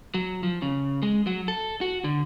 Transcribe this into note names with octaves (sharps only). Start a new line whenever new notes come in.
F#3
F3
C#3
G#3
F#3
A4
F#4
D3